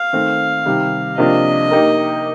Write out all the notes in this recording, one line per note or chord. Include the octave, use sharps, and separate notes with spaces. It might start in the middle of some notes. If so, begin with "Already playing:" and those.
Already playing: F5
D#3 A3 C4
C3 D#3 G3
C3 F3 A#3 D4 D#5
A#3 D#4 G4 A#4